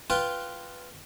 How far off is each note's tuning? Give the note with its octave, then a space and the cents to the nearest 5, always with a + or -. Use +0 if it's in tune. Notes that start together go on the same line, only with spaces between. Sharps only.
F4 +0 B4 +0 G5 +0